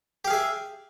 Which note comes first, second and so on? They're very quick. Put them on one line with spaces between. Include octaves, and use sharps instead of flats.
G4 F5 G#4 E5